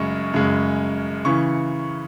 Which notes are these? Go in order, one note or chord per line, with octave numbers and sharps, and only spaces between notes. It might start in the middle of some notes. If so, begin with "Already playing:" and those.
Already playing: F#2 C#3 G#3 C#6
F#2 C#3 G#3
C#3 E3 C#6